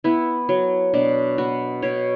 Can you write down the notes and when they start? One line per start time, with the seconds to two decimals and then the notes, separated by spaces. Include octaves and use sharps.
0.04 B3 E4
0.49 F#3
0.94 B2 D4
1.38 B3 F#4
1.82 B2 C#5